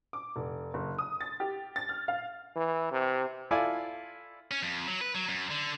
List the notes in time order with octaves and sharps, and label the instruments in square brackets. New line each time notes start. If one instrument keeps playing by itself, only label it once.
[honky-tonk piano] D6
F1
F#1
D#6
A6
G4
A6
F6
F5
[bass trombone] E3
C3
[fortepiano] E4 F4 A4 D5 F5 G#5
[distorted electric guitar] C#4
F2
F#3
B4
F#3
F#2
D3